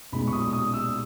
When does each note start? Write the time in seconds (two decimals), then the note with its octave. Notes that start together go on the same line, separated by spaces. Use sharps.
0.12 B1 A#2 G#3 B5
0.27 C#6
0.33 D#6
0.53 D#6
0.74 E6